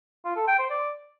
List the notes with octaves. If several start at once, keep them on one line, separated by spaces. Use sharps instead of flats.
F4
A4
G5
C5
D5